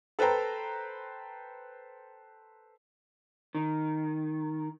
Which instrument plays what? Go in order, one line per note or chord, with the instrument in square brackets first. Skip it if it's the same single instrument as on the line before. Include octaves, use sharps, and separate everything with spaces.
[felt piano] A4 B4 C5 G5 A#5
[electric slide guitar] D#3